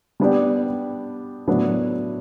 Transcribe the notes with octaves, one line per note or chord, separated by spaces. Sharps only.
G3 B3 D4 G4 D5
A2 F#3 B3 D4